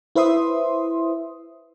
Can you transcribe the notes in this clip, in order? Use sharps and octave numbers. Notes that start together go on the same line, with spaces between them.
E4 B4 C5 E5 C6 D#6